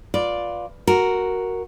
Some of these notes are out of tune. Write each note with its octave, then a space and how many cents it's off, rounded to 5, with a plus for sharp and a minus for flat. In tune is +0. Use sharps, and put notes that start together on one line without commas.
F4 +10 B4 +0 D5 +0
F#4 +0 A#4 +0